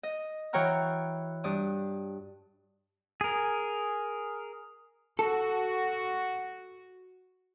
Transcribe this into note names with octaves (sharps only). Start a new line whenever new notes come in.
D#5
E3 F#4 C#5 G5 A#5 F6
G2 D5 D#6
G#4 A#4
F#4 A4